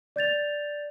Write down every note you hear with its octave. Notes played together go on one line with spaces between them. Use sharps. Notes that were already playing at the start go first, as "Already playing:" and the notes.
D5 G6 A6 F7